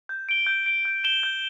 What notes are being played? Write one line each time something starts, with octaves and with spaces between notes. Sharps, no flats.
G6
D7 G7
G6
D7 G7
G6
E7 G7
G6